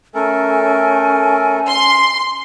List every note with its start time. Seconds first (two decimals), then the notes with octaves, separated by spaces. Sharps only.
0.15 A3 C#4 A4 A#4 G#5
1.69 C6